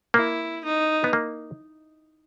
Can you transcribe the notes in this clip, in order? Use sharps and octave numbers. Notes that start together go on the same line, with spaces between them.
A#3 E4
D#4
B3
A#3